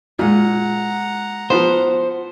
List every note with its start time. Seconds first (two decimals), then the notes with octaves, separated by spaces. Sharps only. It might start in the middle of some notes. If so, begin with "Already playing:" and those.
0.19 A#2 G#3 F4 F#5 A#5
1.50 F3 B3 C5